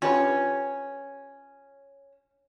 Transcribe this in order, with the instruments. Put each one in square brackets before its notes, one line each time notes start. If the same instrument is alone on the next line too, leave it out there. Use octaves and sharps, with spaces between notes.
[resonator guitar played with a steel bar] C#4 [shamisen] F4 G4 B4